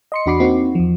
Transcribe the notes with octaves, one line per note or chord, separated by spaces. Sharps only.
D#5 C6 C#7
E2 D4 F#4 B5 D6 C7
A#3 C4 D#4 F#4
E2 F3